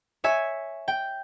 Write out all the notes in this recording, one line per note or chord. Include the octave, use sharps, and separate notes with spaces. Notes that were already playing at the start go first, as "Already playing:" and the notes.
C#5 E5 G#5
G5